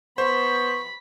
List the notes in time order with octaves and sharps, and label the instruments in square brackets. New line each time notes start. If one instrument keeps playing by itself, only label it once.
[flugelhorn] B3 [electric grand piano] C5 [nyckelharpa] B5 [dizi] C#6